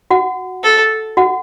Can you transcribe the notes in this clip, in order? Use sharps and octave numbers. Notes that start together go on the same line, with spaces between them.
F#4 F#5
A4
F#4 F#5